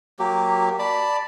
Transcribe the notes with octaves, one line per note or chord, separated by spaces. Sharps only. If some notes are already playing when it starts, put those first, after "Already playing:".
F#3 A#3 G4
D5 A5 B5